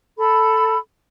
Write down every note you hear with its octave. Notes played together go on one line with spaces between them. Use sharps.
A4 B5